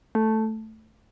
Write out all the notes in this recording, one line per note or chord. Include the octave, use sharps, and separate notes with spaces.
A3